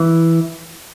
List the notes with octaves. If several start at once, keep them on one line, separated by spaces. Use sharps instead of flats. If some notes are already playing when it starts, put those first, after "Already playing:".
Already playing: E3